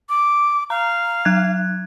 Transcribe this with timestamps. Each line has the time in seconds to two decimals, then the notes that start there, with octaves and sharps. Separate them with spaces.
0.09 D6
0.70 F5 A#5
1.25 F#3 F#6 G#6